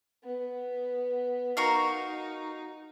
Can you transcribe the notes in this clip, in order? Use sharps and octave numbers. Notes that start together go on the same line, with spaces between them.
B3
D#4 F#4 A#4 F5